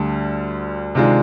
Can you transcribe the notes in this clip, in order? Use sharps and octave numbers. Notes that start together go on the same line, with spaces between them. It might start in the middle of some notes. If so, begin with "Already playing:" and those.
Already playing: D2 D3 G3
C3 D#3 G#3 D4 F4